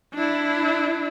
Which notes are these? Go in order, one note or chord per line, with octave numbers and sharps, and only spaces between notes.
D4 E4